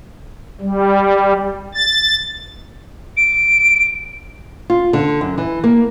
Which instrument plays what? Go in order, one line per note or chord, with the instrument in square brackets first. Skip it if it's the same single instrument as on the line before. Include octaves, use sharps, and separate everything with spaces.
[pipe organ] G3
A6
[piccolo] D7
[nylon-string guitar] F4
D3
F#2
E3
A#3